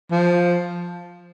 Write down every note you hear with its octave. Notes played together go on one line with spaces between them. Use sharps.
F3